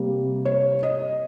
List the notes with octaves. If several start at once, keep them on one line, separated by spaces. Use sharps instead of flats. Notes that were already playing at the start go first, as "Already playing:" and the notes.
Already playing: C3 G3 A#3
C#5
D#5